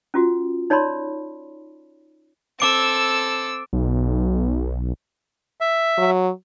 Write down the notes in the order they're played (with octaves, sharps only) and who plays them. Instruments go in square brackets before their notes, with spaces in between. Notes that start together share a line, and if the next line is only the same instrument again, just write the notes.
[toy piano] C#4 F4 F#4
D#4 C#5 D5 A5 B5 C6
[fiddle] C4 E6 [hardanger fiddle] A4 [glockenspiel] D6 D7
[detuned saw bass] B1
[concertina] E5
[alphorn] F#3